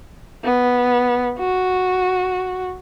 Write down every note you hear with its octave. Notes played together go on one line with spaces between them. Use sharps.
B3
F#4